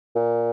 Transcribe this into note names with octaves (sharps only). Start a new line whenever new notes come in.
A#2